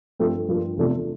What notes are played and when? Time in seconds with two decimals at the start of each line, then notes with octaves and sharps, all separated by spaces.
0.19 G2 F3 A3 C4
0.49 G2 F3 A#3
0.77 E2 C3 F3 A3 D4